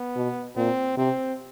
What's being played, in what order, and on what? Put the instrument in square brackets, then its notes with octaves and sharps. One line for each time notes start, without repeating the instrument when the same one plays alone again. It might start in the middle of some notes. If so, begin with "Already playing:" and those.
Already playing: [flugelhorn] B3
[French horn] B2
[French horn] A#2 [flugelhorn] C4
[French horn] C3 [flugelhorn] C4